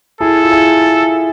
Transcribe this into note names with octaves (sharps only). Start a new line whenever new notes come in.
E4 G#4 A4
F4
E4 G#4